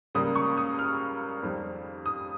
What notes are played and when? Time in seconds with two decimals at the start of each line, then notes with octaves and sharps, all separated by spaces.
0.15 C#2 C#3 G3 A#3 D#6
0.35 C#6
0.58 D#6
0.79 F6
1.43 F2 D#3 G3
2.06 D#6